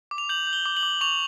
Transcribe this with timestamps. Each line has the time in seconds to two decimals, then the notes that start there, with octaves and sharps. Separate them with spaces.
0.11 D6
0.18 F7
0.29 G6 F#7
0.47 G6
0.53 G7
0.66 D6
0.77 F#7
0.83 D6
1.01 C#6 F7